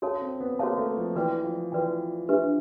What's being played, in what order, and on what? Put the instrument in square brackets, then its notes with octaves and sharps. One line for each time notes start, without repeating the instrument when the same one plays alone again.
[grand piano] C#4 [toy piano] F#4 A4 C#5 F5 A5
[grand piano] C4
B3
[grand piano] A#3 [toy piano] F#4 A4 C#5 F5 A5
[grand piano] A3
F3
[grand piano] E3 [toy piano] F#4 B4 D5 G5
[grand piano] F3
[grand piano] E3 [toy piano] F#4 B4 D5 G5
[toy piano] D4 G4 B4 E5